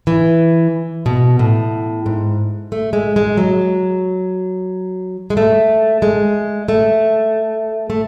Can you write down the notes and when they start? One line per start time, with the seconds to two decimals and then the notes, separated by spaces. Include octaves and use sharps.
0.07 E3
1.06 B2
1.39 A2
2.06 G#2
2.72 A3
2.93 G#3
3.16 G#3
3.37 F#3
5.30 G#3
5.37 A3
6.02 G#3
6.68 A3
7.90 A3